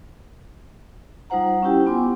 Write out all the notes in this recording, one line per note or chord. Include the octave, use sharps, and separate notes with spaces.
G3 D#4 F4 C5 F#5 A#5
C#4 D#4 E4 G4 G5
B3 F4 G#5 C6 D6